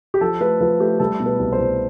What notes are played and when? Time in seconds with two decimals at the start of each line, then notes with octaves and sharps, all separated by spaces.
0.14 G4
0.21 F3 A4
0.41 A3 B4
0.61 F3 B4
0.80 A3 G4
1.00 G3 A4
1.20 B2
1.26 B4
1.39 C2
1.53 C5
1.59 C2